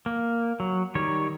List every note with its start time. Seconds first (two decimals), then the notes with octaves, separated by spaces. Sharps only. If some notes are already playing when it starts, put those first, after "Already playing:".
0.06 A#3
0.60 F#3
0.95 D#3 G3 C#5